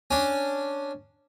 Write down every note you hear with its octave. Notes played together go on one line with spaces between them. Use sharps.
C#4 D4